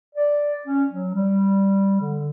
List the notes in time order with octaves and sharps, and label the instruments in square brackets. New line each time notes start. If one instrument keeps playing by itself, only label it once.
[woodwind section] D5
C#4
F#3
G3
D3